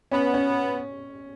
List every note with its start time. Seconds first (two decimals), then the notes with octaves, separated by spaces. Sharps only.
0.11 B3 C#4
0.34 C#4